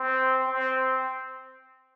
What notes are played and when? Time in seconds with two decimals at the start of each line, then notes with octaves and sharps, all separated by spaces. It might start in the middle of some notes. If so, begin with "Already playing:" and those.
Already playing: C4
0.48 C4